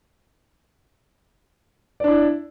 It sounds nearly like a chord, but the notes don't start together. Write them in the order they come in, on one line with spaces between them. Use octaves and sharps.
D5 D4 E4